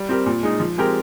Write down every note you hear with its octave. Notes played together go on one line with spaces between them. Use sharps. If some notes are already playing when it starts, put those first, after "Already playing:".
Already playing: G3
C4 G4 A#4
A#2
G#3 D#4
F3
G#3 C4 G4 A#4